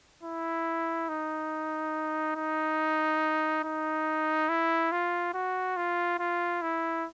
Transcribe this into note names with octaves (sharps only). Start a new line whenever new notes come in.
E4
D#4
D#4
D#4
E4
F4
F#4
F4
F4
E4